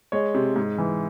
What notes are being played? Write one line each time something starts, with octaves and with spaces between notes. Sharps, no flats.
G#3 C#5
C3
G#2
E3